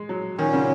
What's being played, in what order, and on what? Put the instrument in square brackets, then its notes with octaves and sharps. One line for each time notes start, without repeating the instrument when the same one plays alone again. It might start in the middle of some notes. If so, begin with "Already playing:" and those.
Already playing: [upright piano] G#3
F#3
[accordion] A#2 F#3 C#4 [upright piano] D#3
[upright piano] C#3